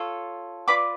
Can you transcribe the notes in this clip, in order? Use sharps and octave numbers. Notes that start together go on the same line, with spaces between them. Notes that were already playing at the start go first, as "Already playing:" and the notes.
Already playing: F4 A4 C#5
F4 B4 D5 B5 D6